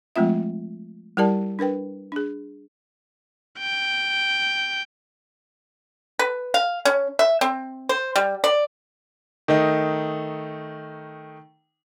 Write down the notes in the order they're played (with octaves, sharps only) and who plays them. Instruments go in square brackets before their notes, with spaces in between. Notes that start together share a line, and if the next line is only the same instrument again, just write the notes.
[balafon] F3 G#3 A3 C4 F4 E5
G3 E4 G4 A#4 D5 A5
D4 A#4 B4 G5
D4 G#4
[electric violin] G5
[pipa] B4
F5
C#4
E5
C4
C5
G3
D5
[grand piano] D#3 A3 D#4